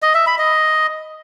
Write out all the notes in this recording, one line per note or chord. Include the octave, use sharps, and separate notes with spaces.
D#5
E5
B5
D#5